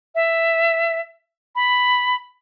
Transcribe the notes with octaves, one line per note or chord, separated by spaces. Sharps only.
E5
B5